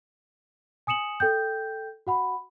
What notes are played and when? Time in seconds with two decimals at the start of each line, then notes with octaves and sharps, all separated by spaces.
0.87 G#5 D#6 C#7 E7 F#7
1.20 A4 G5 G6
2.07 F#4 F#5 B5